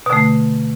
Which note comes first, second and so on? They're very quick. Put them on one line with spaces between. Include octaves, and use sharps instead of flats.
B2 D3 A3